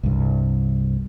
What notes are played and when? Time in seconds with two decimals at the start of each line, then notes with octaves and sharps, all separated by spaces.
0.03 C2 G2